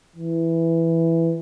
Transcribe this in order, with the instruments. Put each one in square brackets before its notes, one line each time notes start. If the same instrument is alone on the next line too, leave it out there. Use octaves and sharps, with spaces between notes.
[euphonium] E3